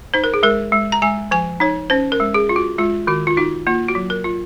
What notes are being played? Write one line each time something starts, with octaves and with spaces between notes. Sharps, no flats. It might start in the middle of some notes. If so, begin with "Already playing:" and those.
D#4 C5
A#4
G#4
G#3 A#4
G#3
A#5
G#3 G#5
F3 G#5
D#4 C#5
C#4 C5
A#4
G#3
G#4
F4
F#4
G#3 F4
D#3 F#4
F4
D#4 F#4
A#3 F4
F#4
F#3
A#4
F4